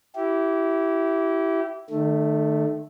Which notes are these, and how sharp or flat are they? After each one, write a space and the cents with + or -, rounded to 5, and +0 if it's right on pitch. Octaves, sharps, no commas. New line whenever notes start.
E4 +0 G4 -25
D#3 -45 A3 +0